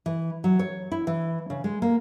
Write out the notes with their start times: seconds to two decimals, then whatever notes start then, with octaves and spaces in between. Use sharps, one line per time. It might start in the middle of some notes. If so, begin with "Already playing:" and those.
0.06 E3
0.44 F#3
0.59 C#5
0.92 E4
1.07 E3
1.50 C#3
1.64 G#3
1.82 A#3